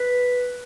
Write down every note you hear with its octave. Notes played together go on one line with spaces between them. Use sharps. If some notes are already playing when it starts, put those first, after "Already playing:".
Already playing: B4